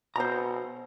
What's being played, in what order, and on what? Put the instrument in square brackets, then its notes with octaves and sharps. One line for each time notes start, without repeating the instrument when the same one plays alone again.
[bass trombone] B2 [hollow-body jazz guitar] C5 A#5